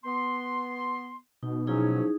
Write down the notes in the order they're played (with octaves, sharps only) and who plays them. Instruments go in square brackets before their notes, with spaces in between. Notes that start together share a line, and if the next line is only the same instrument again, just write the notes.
[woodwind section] B3 C6
[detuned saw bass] B2 [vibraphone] D#4
[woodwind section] F3 F#3 C#4 [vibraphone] D#4 E4 G#4